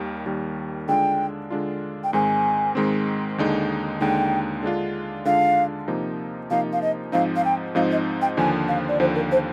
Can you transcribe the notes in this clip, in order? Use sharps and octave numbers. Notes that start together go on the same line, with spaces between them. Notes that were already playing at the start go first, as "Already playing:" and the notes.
Already playing: D#2 D#3 G3
D#2 D#3 G3
D3 G#3 D4 F4 G5
D3 G#3 D4 F4
G5
G#2 D#3 G#3 C4 G#5
G#2 D#3 G#3 C4
D#2 D3 G#3 D#4
D#2 D3 G#3 D#4 G5
D3 G#3 D4 F4
D3 G#3 D4 F4 F5
C3 F3 A#3 D#4
C3 F3 A#3 D#4 F5
F5
D#5
G#2 F3 C4 D#4 F5
F5
G5
G#2 F3 C4 D#4 F5
D#5
G5
D#2 D3 F3 G#5
F5
D5
D#2 D3 F3 C5
A#4
C5